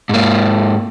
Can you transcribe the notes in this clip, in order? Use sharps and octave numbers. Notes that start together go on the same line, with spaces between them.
G#2 A#3